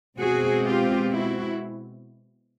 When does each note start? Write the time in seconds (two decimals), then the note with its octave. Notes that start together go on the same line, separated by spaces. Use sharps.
0.18 B2 G#3 C4 F#4 G#4
0.65 F4 G4
1.12 E4 F#4